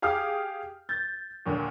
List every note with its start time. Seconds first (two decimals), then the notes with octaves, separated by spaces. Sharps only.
0.02 G4 G#4 F5 D6 D#6 F6
0.89 G6 A6
1.46 D#2 A#2 D3